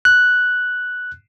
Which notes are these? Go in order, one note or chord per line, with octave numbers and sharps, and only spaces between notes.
F#6